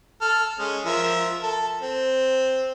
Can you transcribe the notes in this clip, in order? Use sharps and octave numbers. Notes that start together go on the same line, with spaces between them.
A4 F6
G#3 C#4
F3 A#4 E5
A4
C4